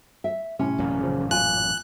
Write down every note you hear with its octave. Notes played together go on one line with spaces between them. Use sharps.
E5
A2 C3 C#4
A1 F#2 A#2
C#3 F3
F4 G#5 F#6